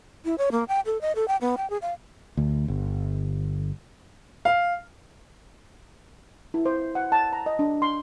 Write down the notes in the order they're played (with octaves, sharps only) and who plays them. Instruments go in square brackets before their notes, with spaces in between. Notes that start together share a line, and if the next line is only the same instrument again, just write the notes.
[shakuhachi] E4
C#5
A#3
G5
A4
D#5
A4
G5
B3
G5
G#4
F5
[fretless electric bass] D2
G1
[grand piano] F5
[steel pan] E4
C5
F#5
A5
A#5
D#5
D4
C6